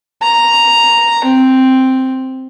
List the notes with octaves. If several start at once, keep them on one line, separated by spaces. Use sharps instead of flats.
A#5
C4